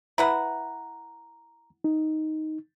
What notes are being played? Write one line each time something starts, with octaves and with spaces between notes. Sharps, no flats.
E4 B4 F#5 A#5
D#4